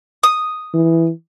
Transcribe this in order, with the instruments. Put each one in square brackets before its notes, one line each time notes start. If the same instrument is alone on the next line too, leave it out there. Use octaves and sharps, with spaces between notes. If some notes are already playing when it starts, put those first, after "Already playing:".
[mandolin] D#6
[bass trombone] E3